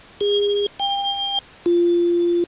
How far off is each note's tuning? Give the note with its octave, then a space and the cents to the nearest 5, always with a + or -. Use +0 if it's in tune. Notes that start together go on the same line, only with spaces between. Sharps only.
G#4 -30
G5 +30
F4 -15